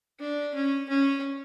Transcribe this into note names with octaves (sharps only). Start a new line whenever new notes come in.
D4
C#4
C#4